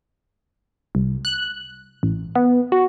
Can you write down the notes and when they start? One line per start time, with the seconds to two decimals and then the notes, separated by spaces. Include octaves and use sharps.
0.95 C2
1.25 F#6
2.03 A1
2.36 B3
2.72 F#4